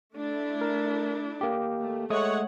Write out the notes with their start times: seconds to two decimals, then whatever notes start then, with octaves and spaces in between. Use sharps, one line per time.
0.15 A3 D4 E4
0.61 A#4
1.41 A#3 G4
1.79 A3
2.10 G#3 A3 C#5 F#5 D#6